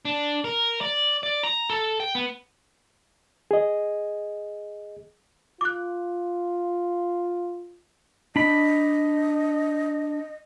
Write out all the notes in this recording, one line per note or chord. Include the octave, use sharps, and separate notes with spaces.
D4
A#4
D5
D5
A#5
A4
G5
B3
G#4 D#5
F4 D6 F#6
D4 D#5 B5